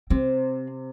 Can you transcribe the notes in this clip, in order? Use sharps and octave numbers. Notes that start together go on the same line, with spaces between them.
C3 C4